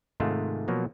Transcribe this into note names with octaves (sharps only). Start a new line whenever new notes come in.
G#2 C3 D#3 G#3 A3 F4
B2 F3 F#3 A#3